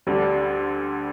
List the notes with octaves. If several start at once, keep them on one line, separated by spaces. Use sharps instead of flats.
D2 D3 G3 D4